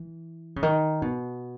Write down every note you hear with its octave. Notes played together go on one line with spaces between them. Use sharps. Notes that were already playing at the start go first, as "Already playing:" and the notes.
Already playing: E3
C#3
D#3
B2